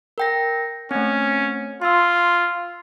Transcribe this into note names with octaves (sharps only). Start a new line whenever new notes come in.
A#4 G5 A#6
A3 C4 C#4
F4 C6 E6